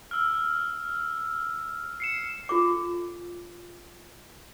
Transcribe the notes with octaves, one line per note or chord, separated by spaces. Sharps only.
E6 F6
C7 C#7 E7
F4 A4 D6